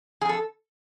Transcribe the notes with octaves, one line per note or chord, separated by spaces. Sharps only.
F2 G#4
A4